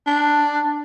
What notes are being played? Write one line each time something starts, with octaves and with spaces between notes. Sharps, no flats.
D4